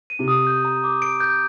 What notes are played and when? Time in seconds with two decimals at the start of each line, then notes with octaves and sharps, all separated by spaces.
0.10 D#7
0.19 C3
0.28 D#6
0.47 G6
0.65 A#5
0.84 D6
1.02 D7
1.20 G6